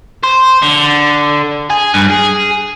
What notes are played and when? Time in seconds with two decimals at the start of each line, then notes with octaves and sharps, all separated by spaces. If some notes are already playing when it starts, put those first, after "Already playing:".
0.23 C5
0.62 D3
1.70 G#4
1.94 G2
2.10 G#4